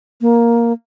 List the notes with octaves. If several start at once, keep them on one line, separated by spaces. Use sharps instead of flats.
A#3